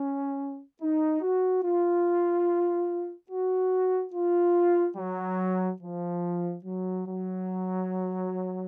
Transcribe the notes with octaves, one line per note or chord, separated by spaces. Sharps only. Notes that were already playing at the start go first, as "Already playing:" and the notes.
Already playing: C#4
D#4
F#4
F4
F#4
F4
F#3
F3
F#3
F#3